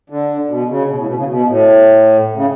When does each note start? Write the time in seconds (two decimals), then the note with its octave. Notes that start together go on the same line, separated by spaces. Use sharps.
0.10 D3
0.49 B2
0.69 C#3
0.89 B2
0.99 A2
1.08 B2
1.18 C#3
1.28 B2
1.48 A2
2.36 C#3